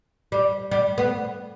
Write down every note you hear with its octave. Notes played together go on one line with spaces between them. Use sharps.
G3
G3
B3